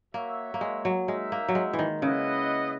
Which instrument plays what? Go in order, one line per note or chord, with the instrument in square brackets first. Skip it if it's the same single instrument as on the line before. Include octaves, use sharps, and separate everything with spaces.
[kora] A#3 [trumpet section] F#4 C#5 E5
[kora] A#3
G#3
F#3
[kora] G#3 [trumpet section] D#4 A#4 E5
[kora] A#3
F#3
G#3
E3
D#3
[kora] C#3 [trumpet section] E4 B4 D#5 F#5